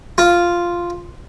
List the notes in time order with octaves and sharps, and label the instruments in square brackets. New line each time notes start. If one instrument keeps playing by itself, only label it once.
[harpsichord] F4